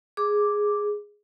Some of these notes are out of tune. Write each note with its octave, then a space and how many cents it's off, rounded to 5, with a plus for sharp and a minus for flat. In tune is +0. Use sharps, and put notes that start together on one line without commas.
G#4 +0 D6 +0